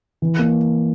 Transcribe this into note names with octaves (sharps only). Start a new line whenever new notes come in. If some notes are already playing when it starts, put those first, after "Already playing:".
E3
A#3